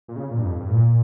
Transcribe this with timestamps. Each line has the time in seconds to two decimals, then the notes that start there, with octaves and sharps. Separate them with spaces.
0.08 A#2
0.16 C#3
0.31 A#2
0.39 G2
0.45 F2
0.60 G2
0.69 A2
0.74 A#2